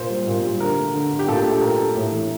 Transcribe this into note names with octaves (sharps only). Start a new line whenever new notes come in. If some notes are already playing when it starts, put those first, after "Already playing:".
Already playing: A#2 C5
G3
A#2
G3
D3 A#4
A3
D3
A3
G4
A#2 A4
G4
A3
A4
A#2 A#4
A3
A2
E3 A3